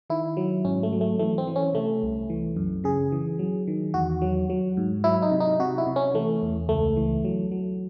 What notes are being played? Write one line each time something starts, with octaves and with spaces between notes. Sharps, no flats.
D#3 E4
F#3
G#2 C#4
A3
F#3
A3
E3 A3
C4
E3
C#4
C3 A3
C2
E3
F#2
C#3 G#4
E3
F#3
D#3
E2 F#4
F#3
F#3
G#2
F#3 E4
D#4
C3
D#4
C3 F#4
E4
C3
C#4
E3 A3
E2
C#2 A3
E3
F#3
F#3